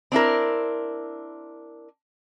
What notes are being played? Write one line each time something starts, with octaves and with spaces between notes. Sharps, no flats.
C4 D4 E4 A#4